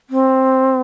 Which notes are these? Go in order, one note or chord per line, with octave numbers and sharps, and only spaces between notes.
C4